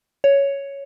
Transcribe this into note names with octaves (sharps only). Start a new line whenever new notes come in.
C#5